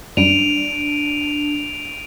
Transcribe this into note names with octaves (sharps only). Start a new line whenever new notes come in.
F#2 G3 D4 D7 D#7 F7